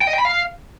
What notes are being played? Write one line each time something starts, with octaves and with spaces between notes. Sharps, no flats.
G5
D#5
G5
B5
F5